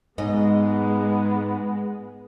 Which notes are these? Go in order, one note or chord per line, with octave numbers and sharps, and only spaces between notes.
G#2 G#3 B3 D#5